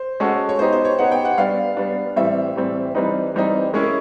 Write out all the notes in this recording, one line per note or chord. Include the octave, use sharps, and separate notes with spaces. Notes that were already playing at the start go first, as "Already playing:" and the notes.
Already playing: C5
G#3 C#4 F#4 A4
C#5
B3 D#4 G4 C5
C5
C#5
B3 D#4 G4 F#5
G5
F#5
G3 B3 D4 F5
G3 B3 D4
A2 E3 G3 C4 E5
A2 E3 G3 C4
E3 G3 C4 D#4 B4
E3 G3 C4 D#4
G#3 C#4 E4 A#4